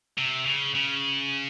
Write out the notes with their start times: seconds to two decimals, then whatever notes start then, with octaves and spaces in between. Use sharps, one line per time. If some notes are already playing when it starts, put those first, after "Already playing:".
0.18 C3
0.46 C#3
0.75 C#3